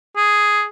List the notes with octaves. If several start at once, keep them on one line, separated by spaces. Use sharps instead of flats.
G#4